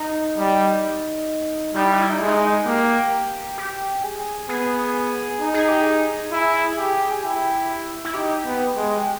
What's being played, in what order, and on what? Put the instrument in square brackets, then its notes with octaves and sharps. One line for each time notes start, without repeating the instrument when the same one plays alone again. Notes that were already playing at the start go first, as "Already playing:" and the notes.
Already playing: [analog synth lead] D#4
[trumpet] G3
[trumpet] G3 [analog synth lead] D#4
[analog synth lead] E4
D#4
E4
D#4
[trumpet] G#3 [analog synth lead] E4
[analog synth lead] D#4
[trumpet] A#3 [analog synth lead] G4
[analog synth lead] G4
G#4
[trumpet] B3 [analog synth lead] G#4
[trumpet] D#4
[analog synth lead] G#4
G4
G#4
[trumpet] E4
G4
[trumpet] E4 [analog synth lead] G4
[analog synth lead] E4
[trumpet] D#4 [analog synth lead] G4
[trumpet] B3
G#3